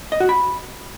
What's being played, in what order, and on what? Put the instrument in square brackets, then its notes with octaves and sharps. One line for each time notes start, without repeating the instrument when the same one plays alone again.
[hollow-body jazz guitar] D#5
F#4
B5